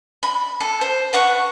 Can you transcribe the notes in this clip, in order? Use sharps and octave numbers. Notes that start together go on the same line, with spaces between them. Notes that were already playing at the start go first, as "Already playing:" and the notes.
B5
A4
C5
B4 F#5 C#6 F#6